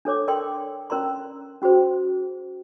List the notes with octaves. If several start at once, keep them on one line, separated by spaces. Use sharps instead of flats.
D4 A4 C#5 D6
A4 A#4 D5 G5 C6
C#4 A#4 D5 A#5 C6
C#4 F#4 G#4 C5